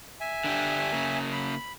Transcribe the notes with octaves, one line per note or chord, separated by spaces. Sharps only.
E5 G#5
D3 D4 G4
C#3 A#3
B5